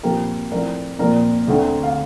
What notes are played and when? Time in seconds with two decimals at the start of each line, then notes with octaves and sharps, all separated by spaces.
0.03 A#2 F3 C4 G4 A#4
0.51 A2 F3 C4 A#4 D5
0.99 A#2 F3 C4 A#4 D5
1.47 D2 D3 A3 C4
1.83 F5